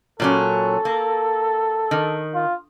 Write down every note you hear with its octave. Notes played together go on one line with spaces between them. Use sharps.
A#2 F#3 C#4 A4
A#3
D#3
F4